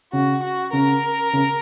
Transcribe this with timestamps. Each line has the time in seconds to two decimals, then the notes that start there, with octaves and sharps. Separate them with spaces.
0.13 C#3 F#4
0.42 F#4
0.72 C#3 A#4
1.33 C#3